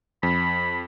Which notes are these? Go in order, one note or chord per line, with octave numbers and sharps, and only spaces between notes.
F2 B5